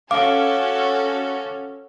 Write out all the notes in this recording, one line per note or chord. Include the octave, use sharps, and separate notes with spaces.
C#4 F#4 A4 F5 D6